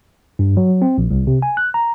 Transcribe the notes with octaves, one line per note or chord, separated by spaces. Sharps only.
G2
F#3
C4
A#1
C2
C3
G#5
F#6
A#5